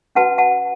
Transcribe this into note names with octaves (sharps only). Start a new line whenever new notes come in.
C#4 F#4 B4 F#5 A5
F#5 A5